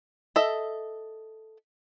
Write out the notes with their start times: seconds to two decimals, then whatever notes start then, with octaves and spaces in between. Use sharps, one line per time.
0.36 A4 D#5 E5